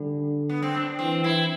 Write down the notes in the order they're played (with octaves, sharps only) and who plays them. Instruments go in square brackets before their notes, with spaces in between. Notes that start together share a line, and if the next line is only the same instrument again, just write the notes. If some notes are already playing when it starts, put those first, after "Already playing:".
Already playing: [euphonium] D3 [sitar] G3
[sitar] B3
C4
D4
[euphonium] E3 [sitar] C4
[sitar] E4